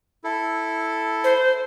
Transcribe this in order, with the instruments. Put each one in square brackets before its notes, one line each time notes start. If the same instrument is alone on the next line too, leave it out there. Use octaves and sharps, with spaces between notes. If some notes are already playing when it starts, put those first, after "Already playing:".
[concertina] E4 A4
[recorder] C5